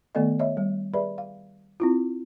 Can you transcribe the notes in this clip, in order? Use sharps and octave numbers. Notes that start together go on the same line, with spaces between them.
D#3 A3 B3 A4 D5 D#5
C#5 D#5 E5
G3
G4 G#4 B4 D5 E5 B5
F5
C4 E4 F4